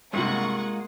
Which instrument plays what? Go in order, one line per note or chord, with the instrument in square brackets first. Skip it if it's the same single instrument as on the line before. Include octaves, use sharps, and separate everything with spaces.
[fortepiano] G2 C3 [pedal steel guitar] G#3 A#3 F4 [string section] F#5 C#6